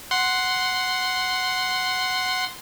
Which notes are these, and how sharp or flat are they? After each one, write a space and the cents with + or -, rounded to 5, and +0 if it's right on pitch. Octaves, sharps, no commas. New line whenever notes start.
F#5 +0 C6 +0